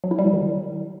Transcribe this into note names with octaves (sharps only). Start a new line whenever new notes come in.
F#3
E4
G3
F#3
D#3